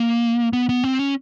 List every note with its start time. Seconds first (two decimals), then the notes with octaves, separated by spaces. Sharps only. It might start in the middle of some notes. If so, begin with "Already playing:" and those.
Already playing: A#3
0.53 B3
0.69 B3
0.84 C4
0.99 C#4